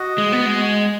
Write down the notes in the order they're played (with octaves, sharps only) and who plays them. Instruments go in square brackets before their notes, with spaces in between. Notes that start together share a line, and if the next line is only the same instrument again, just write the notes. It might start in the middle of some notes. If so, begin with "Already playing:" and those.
Already playing: [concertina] F#4 D#5 F#5
[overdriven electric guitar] G#3
B3
G#3